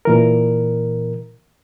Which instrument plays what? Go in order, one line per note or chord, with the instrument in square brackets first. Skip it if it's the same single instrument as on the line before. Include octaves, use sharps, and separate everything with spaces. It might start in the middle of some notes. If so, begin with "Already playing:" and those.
[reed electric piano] A#2 E3 A#4